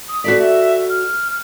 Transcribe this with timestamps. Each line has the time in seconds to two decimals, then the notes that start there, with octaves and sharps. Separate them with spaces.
0.09 D#6
0.24 F#4 A4 D5 B6
0.39 E5
0.90 F6